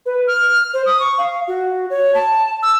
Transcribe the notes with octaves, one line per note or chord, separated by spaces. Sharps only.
B4
F6
C5
D#6
C#6
F5
F#4
C#5
A5
E6